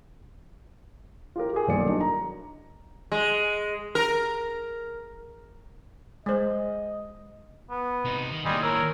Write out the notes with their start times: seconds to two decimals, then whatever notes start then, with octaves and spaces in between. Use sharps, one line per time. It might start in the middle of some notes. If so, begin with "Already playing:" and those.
1.36 F4 G4 A#4
1.53 G4 G#4
1.67 D#1 B1 A#3 D5 C#7
1.87 D4 D#4 F#4 A#4
2.01 A#5
3.12 G#3
3.95 A#4
6.26 G#3 C5 D#5
7.70 B3
8.05 C3 D#4
8.31 D#3
8.45 D#2 A2 G3 D#5 G#5 C6
8.63 A#4 C#5 E6